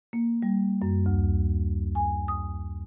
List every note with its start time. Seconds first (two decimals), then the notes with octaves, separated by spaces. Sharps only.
0.13 A#3
0.43 G3
0.82 F#2
1.06 D2
1.95 G#5
2.28 D#6